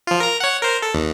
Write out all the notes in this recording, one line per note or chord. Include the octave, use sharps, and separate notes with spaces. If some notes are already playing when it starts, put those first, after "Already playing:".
F3 F4
A#4 A#5
C#5 F#5
A#4 C5
A4
D#2